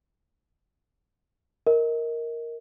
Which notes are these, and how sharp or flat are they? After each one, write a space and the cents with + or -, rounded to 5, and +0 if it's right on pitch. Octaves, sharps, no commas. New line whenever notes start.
A#4 +0 D#5 +30